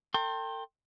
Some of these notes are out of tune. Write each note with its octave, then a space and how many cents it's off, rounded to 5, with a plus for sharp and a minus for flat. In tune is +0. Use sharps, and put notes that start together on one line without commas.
A4 +40 G5 +5 C6 +35